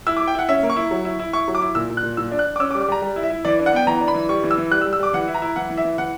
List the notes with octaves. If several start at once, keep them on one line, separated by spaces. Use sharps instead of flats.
E4 E6
D6
E4
G5
E4 F#5
C#4 E5
A#3
C#6
E4
F#3
E4
E4
E4 C#6
F#3
D6
E4
A#2 E6
A#2
F#6
A#2
A#2 E6
D4
F#6
D4
D6
C#4 E6
D6
G3
D6
G3 A#5
G3
E4
E5
E4
E3 D5
D4
F#5
B3 G5
E3 A#5
D4
B5
E3
G3 C#6
E3
E6
E3
G3 F#6
E6
G3
E6
G3 D6
E3 F#5
E4
A#5
E4
E3 F#5
E3
E5
E3
E3 F#5